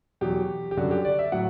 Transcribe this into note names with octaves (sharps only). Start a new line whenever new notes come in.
E2 B2 F#3 G4
G4
F#2 D3 G3 F#4
G4
D5
E5
A2 F#3 F#5